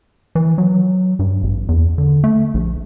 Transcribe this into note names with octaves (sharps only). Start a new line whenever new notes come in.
E3
F#3
G2
A1
E2
D3
A3
A#1